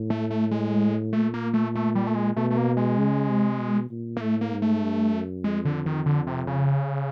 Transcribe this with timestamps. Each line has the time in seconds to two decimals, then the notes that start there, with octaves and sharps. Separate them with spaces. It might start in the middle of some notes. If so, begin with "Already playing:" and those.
Already playing: A2
0.10 A3
0.31 A3
0.51 G#3
1.13 A#2 A3
1.34 A#3
1.54 A3
1.75 A3
1.95 G3
2.07 A3
2.15 G#3
2.36 B2 A3
2.50 A3
2.57 A#3
2.77 G#3
2.98 C#3
3.29 C3
3.60 B2
3.91 A#2
4.17 A#3
4.21 A2 A3
4.41 A#3
4.52 G#2
4.62 A3
4.83 G2
5.14 F#2
5.44 F2 G#3
5.65 D3
5.86 D#3
6.06 D3
6.27 C3
6.47 C#3